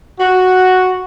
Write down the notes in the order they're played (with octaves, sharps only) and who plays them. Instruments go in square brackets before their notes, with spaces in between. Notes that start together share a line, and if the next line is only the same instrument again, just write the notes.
[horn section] F#4